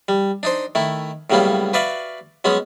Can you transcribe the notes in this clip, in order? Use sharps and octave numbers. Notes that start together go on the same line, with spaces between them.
G3
D4 D#4 C5
D#3 A3 E4
A2 C#3 F#3 G3 A#3 B3
F#4 B4 D5 E5 F5
F#3 G#3 B3 C#4